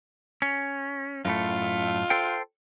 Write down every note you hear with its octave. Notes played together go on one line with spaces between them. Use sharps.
C#4
F#2 A2 A3 F4
A4 C5 G5